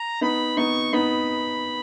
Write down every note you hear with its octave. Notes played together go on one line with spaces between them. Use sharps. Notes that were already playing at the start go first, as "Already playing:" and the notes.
Already playing: A#5
B3 D#4 B5
B3 D#4 C#6
B3 D#4 B5